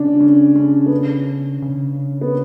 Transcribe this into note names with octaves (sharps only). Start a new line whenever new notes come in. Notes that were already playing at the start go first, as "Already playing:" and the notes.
Already playing: C#3 C#4 D4
C#4
C#4
B3
C#4
C#3
B3